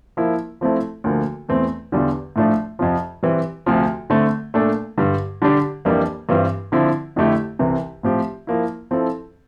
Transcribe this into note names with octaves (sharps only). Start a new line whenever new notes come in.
F3 A#3 E4
F3 A3 C4 E4 A4
D2 D3 F3 A#3
E2 E3 A3 C4
E2 D3 G3 D4 F4
A2 F3 A3 D4
F2 C3 F3
E3 G3 C4
D2 C3 F3
D3 A3 C4
A#2 A3 D4 A4
G2 D3 G3
D3 G3 D4 G4
F2 E3 G3 A#3 D4
G2 E3 G3 C4 F4
D3 F3 C4 E4
F2 D3 A3 E4 G4
C2 C3 E3
A2 F3 C4 G4
F3 A#3 E4
F3 C4 E4 A4